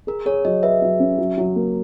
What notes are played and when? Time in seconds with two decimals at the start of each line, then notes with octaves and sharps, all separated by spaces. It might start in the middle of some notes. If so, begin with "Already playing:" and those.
0.07 G#4 A#4
0.26 G#4 C#5
0.45 F#3 D#5
0.63 B4 E5
0.82 F#3
1.00 C#4
1.18 F#3
1.38 F#3
1.56 A#3